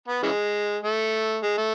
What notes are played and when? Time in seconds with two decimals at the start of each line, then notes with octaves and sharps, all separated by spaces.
0.08 B3
0.23 C#3 E3 G#3
0.83 A3
1.43 G#3
1.58 A3